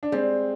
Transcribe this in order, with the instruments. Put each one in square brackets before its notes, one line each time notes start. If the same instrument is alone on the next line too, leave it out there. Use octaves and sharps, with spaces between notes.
[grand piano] D4
[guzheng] G3 [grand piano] G#3 C4